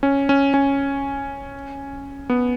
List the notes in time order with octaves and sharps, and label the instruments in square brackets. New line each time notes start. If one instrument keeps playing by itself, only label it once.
[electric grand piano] C#4
C#4
C#4
B3